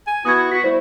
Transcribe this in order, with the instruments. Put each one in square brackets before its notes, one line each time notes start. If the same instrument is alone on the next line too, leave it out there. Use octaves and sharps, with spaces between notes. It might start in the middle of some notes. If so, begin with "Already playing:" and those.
[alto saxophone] G#5
[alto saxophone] B3 [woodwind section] E4 F#4 [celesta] D#6 G#6
[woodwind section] F#4 [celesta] B6
[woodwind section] G3 A3 E4 [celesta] C5